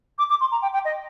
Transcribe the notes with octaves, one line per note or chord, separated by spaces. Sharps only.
D6
D6
C6
A#5
G5
G5
D#5